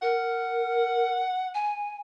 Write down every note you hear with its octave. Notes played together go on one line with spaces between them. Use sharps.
A#4 F#5
G#5